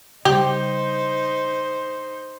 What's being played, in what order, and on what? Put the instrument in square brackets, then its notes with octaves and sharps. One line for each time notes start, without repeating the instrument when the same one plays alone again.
[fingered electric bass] C#3 G3 [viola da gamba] D#4 C5 [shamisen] G4